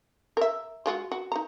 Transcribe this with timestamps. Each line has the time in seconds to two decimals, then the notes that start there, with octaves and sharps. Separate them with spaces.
0.37 A#4 E5
0.86 G#3 F4 F#4
1.12 F#4
1.32 D#4 A#5